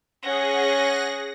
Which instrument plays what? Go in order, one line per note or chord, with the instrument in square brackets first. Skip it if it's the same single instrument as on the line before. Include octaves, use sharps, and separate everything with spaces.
[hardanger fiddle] C#4 [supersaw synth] G#4 F#5 A#6